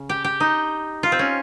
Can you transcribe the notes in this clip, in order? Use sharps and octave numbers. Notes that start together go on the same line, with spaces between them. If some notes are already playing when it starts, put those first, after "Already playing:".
Already playing: C#3
G4
G4
D#4
F4
C4
C#4